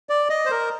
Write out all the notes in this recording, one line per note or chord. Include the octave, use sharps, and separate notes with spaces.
D5
D#5
C5
A#4